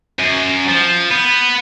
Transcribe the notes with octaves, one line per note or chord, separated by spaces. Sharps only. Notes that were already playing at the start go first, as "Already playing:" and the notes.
F#2
F3
B3